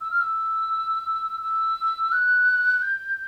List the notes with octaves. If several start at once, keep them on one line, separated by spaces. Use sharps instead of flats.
E6
F6
E6
E6
F#6
G6